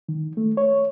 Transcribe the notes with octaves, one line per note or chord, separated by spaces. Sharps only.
D#3
A3
C#5